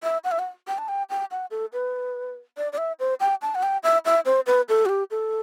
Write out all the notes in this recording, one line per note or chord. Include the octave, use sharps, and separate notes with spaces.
E5
F#5
E5
F#5
G5
A5
G5
G5
F#5
A4
B4
D5
D5
E5
C5
G5
A5
F#5
G5
E5
E5
C5
B4
A4
F#4
G4
A4